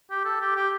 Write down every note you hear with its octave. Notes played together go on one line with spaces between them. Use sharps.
G4
A4
G4
G4